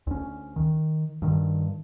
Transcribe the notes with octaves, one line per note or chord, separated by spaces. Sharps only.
D2 C#4
D#3
G2 D#3